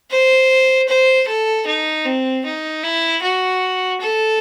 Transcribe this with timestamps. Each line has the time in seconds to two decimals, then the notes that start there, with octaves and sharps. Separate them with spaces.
0.11 C5
0.88 C5
1.28 A4
1.67 D#4
2.05 C4
2.45 D#4
2.83 E4
3.22 F#4
4.01 A4